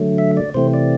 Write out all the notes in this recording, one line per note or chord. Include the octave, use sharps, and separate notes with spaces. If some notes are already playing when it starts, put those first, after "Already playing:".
Already playing: D3 F#3 A3
E5
D5
C3 E3 A3 C4 C5
D5